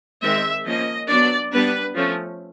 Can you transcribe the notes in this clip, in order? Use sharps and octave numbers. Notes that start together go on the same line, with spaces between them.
D#3 G#3 C4 E5
F3 A#3 C#4 D#5
F#3 B3 D4 D5
G3 B3 D4 B4
F3 A3 C#4